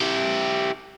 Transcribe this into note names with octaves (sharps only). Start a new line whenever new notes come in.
E4 G4